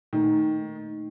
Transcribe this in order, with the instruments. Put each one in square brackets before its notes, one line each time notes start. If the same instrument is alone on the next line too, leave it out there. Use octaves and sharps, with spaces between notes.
[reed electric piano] A#2 A3 D#4 [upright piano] D#3